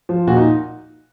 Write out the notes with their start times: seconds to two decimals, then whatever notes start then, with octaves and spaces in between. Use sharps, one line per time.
0.09 F3
0.27 A#2 F#4
0.37 D#4